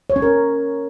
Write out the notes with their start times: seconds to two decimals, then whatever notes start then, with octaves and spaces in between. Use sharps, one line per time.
0.10 C#5
0.16 C#4
0.22 A#4